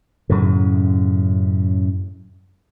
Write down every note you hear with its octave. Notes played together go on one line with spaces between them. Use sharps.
F#2 A2 C#3